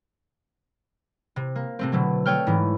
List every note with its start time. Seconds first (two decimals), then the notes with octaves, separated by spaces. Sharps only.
1.36 C3
1.56 A#3
1.79 C3 A3 C4
1.92 B2 D3 F#3
2.26 A3 C#5 G5 F6
2.47 G#2 E3